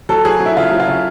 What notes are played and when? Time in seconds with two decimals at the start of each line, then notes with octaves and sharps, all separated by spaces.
0.09 F#3 A4
0.25 F#3 G#4
0.40 F#3
0.46 E4
0.56 C#3 F4
0.71 F#3
0.80 F4
0.87 C#3